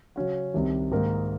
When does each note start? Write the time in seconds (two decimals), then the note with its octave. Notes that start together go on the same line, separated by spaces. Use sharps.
0.16 C#3 F#3 C#4 F#4
0.54 C2 C3 D#3
0.91 G#2 D#3 A#3 D#4 A#4